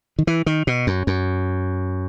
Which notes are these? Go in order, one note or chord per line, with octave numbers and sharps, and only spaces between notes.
D#3
E3
D#3
B2
F#2
F#2